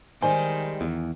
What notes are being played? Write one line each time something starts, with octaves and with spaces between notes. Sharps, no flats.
D#3 G3 G#3 C5 G#5
E2